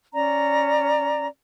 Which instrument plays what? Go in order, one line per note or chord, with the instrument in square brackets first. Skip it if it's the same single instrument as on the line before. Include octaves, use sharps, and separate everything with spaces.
[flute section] C#4 D5 A#5